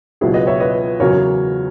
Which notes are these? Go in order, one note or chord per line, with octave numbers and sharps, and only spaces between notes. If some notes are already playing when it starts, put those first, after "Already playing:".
C#2 B2 F#3 E4 G#4
B4 D#5
C#5 E5
B4 D#5
E2 C#3 F#3 A#4 C#5